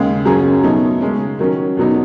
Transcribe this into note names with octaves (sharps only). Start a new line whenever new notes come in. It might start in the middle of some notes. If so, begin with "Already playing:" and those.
Already playing: D#2 C#3 G#3
F#2 C#3 F#3 C#4 G#4
B2 F#3 A3 D#4
C#3 G#3 C#4
D#3 F#3 C#4
E2 B2 F#3 B3 D#4